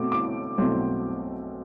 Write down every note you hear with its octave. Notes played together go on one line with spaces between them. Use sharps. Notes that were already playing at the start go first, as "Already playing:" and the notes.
Already playing: B2 A3 C4 D6
D6
B1 B2 A3 C4